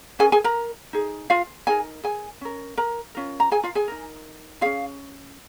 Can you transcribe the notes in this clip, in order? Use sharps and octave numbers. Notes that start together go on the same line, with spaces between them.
C#4 G#4 A#4 G#5
G#4 G#5
A#4 A#5
D#4 G#4
F4 F5
D#4 G#4 A#4 G#5
G#4 G#5
C#4 A#4
A#4 A#5
C#4 F4 A#4
A#5
G#4 G#5
F4 F5
G#4 G#5
D#4 A#4
C#4 F4 G#4 F5